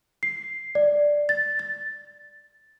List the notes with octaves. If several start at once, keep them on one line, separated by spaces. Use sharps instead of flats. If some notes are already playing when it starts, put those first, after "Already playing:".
C7
D5
A6
A6